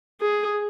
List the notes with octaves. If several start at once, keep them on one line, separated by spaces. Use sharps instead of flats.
G#4